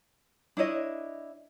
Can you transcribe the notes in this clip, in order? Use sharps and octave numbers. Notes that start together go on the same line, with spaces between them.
D4 E4 C#5 D#5